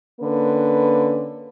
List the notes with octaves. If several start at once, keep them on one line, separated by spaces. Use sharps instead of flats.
D3 A#3 C#4 B4